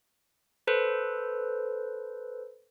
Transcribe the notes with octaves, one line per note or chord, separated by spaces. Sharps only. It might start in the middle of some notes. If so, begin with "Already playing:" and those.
A4 B4 C5